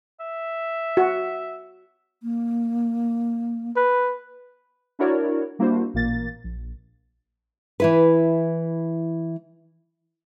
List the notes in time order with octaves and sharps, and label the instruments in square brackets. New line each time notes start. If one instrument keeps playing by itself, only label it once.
[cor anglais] E5
[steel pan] F#4
[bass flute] A#3
[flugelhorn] B4
[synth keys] D4 E4 F#4 A#4 C#5 D5
G3 A#3 D4 E4 F#4 C5
A1 A#2 A#3 A6
A#1
[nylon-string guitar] E3 E4 B4